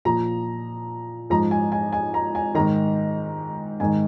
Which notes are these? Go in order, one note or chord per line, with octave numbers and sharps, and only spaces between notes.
A#2 F3 A#5
G#2 F3 A#5
G#5
G#5
G#5
A#5
G#5
G#2 D#3 A#5
G#2 D#3 G#5